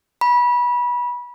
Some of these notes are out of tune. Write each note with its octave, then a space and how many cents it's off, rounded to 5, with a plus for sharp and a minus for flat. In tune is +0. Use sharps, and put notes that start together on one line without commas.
B5 -25